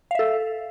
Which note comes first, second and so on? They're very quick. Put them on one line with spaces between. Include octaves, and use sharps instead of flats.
F5 E5 A4